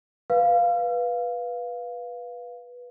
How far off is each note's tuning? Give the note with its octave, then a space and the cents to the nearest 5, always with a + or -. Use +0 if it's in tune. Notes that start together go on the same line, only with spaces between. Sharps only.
B4 -10 F5 +0